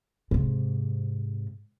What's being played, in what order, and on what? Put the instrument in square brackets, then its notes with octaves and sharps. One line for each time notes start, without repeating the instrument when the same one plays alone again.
[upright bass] G#2 C3